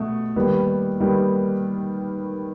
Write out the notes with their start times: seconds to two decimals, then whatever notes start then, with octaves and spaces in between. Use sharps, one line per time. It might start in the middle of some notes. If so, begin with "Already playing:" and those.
Already playing: B2 A3
0.36 D#2 D#3 G3 B3
1.00 D#2 D#3 G3 B3